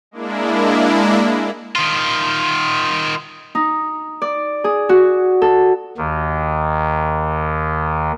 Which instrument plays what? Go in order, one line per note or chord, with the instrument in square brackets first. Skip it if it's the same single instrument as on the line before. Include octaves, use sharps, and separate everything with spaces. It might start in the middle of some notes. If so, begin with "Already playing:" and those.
[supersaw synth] G#3 A#3 D4 E4
[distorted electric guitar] D#3 F4
[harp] D#4
D5
G#4
F#4
A4
[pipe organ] D#2 D#3